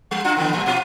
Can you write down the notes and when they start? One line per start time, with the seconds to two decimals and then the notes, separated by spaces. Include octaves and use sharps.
0.11 G3
0.24 D4 F4 F#4
0.37 D3 D#3 B3
0.53 A2 G3
0.66 A#2 F4 F#4